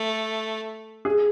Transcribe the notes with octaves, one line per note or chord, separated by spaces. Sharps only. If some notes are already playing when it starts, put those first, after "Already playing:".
Already playing: A3
G#4